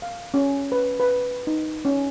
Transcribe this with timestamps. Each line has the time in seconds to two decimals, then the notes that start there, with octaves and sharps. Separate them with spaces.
0.02 F5
0.34 C#4
0.72 B4
1.00 B4
1.47 D#4
1.85 C#4